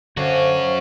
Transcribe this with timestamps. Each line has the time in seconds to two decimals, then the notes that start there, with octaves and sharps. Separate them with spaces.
0.17 D3 C#4 F#4 C5 F5